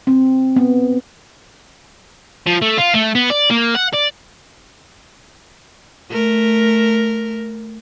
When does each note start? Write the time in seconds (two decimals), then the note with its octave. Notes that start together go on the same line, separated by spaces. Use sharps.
0.07 C4
0.56 B3
2.47 F3
2.62 A3
2.78 F4
2.94 A3
3.15 B3
3.30 D5
3.50 A#3
3.75 F#5
3.93 D5
6.10 A3 A#4